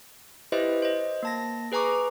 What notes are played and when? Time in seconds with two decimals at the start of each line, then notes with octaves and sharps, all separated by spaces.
0.52 E4 G4 B4 C5 D#5 E5
0.82 C5 D#5
1.23 A#3 A5 A#6
1.72 G#4 B4 G#5 A#5 C#6 D6